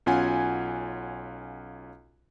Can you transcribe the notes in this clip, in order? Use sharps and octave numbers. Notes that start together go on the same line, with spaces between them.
B1 C#4 F4 F#5 G#5